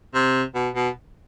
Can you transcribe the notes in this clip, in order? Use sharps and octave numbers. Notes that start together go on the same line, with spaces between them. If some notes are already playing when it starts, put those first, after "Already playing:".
C3
B2
B2